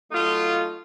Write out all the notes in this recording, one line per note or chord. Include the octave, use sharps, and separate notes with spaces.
F#3 A3 D#4 F4